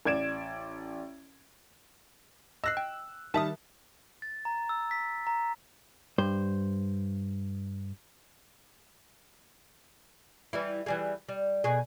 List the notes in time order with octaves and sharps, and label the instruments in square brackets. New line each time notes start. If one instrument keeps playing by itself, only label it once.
[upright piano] A1 D5 G#6 D7 E7
[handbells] D#5 A#6 C7 [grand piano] E6 F#6
[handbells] G5
[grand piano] D#3 G3 A5 [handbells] A#4 E5 D#6
[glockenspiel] A6
A#5
E6
B6
A#5
[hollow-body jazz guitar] G2 C5
[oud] E3 G3 E4
E3 G3 G#4
G3
B2 G#4